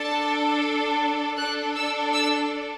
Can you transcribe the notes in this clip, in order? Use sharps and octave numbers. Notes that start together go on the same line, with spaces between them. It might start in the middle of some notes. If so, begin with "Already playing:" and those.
Already playing: D4 A4 A5
D4 A4 F#6
E6
E6